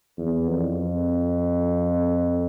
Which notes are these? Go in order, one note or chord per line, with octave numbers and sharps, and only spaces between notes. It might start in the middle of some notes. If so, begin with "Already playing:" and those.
E2
F2